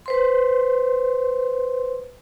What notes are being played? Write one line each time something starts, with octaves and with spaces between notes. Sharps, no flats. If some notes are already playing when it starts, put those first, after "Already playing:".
B4 C5 C6